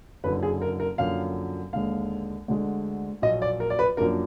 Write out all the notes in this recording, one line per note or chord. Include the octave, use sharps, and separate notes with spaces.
F#1 F#2 D3 B4
G#4
A#4
A#4
F#2 D3 F3 A#3 F5
D#2 D3 G#3 F5
D2 D3 G#3
A#1 A#2 F#3 D#5
D5
A#4
D5
B4
F#2 F3 A#3 D4 A#4